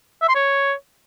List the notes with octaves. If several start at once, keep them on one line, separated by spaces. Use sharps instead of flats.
E5
C6
C#5